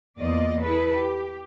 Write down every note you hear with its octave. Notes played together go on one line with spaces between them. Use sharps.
E2 A#3 F4 D5 D#5
E4 G#4 A4 B4
G4